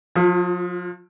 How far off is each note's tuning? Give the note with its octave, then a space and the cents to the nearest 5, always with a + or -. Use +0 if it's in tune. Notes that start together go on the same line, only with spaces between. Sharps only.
F3 +40 F4 +0